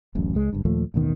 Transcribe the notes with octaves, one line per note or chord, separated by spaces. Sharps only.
D1 A1 F#2
C#2 G#3
F#1 G2
D#2 A#2 F3 A3
A1 D#2 B2 D#3